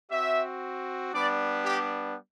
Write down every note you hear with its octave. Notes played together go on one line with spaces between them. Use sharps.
C4 F#4 E5
G3 B3 D4 D5
G4